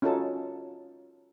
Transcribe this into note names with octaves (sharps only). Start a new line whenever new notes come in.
C#4 D#4 F4 F#4 A4 A5